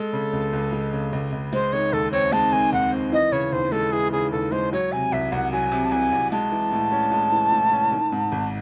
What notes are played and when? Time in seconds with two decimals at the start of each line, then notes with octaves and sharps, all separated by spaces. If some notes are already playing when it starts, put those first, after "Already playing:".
Already playing: G#3 A4
0.13 C#3
0.33 C#2
0.53 C#2
0.73 G#3
0.93 C#3
1.13 C#2
1.32 C#2
1.53 G#3 C5
1.73 D#3 C#5
1.93 D#2 A4
2.12 C4 C#5
2.33 G#3 A5
2.52 D#3 G#5
2.73 D#2 F#5
2.92 C4
3.12 E3 D#5
3.32 C#3 C#5
3.52 D#2 C5
3.72 G#3 A4
3.92 E3 G#4
4.12 C#3 G#4
4.32 D#2 A4
4.52 G#3 C5
4.72 F#3 C#5
4.92 C3 G#5
5.12 C2 E5
5.32 C2 F#5
5.53 F#3 G#5
5.72 C3
5.85 A5
5.92 C2 G#5
6.12 C2
6.32 G#3 A5
6.52 E3
6.72 A2
6.92 C#4
7.12 G#3
7.32 E3
7.52 A2
7.72 C#4
7.92 D#3
8.12 G#2
8.32 G#1